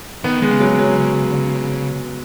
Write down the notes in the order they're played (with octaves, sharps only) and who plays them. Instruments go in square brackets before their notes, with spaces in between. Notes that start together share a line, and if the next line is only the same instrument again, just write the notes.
[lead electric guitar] D#3 [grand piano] B3
[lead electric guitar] D#3 [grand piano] G#3
[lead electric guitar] C#3
[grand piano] F#3
F#3